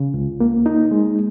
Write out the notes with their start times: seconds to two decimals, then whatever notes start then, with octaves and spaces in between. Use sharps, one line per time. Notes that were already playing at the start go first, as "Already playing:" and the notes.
Already playing: C#3
0.14 C#2
0.40 A#3
0.66 D#4
0.91 G#3